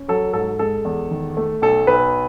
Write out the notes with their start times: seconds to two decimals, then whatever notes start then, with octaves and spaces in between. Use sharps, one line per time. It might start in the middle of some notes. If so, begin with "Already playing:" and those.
Already playing: C#4
0.08 F#3 A4
0.34 G#2 A4
0.59 G#3 A4
0.85 E2
1.11 D#3
1.37 A3
1.62 B1 A4
1.87 B1 B4